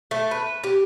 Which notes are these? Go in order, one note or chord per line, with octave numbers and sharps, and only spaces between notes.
A3
B4
G4